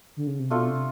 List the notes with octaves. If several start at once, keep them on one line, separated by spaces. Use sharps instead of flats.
D3
C#3
C3
B2 A3 D4 F4 A4
C3